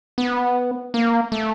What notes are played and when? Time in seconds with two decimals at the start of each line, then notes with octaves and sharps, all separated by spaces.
0.18 B3
0.94 A#3
1.32 A3